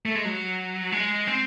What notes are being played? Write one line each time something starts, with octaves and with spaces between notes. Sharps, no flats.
A3
G#3
F#3
G#3
C4